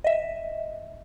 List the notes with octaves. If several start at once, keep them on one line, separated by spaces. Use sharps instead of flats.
D#5 E5